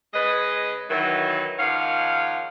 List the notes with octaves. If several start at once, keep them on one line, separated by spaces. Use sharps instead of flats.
C#3 G#3 B4 D#5
D#3 E3 F#3
G#2 D#3 F3 C#4 F5 F#5